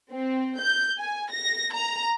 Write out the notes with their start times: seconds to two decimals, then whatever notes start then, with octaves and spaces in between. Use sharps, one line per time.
0.11 C4
0.60 G6
0.99 G#5
1.31 A#6
1.74 A#5